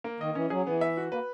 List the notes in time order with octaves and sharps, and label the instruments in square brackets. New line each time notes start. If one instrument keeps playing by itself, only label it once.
[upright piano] A#3
[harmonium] D#3 [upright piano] D#5
[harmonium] E3 [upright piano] C#4
[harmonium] F#3 [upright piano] G#4
[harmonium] E3 [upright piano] B3
[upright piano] E5
F#4
[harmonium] A#3 [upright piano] B4